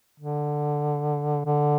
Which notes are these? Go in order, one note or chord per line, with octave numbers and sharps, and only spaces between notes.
D3
D3